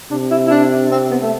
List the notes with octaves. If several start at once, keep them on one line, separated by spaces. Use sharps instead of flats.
C3 D4
E4
E4
D4
C4
B3
A3